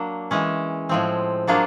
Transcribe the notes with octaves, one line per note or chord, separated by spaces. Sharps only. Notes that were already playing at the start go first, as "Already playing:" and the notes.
Already playing: F#3 A#3 D4
E3 G#3 C#4
A2 F3 G#3 C4
F#3 A#3 D4 F4 G#4